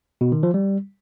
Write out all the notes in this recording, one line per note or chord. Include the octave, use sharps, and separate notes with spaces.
B2
D#3
F3
G3